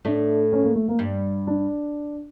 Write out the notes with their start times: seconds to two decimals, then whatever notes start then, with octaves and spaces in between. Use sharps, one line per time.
0.05 A2 A3 D4
0.52 C#4
0.64 A#3
0.75 A3
0.88 A#3
0.99 G2 G3
1.47 D4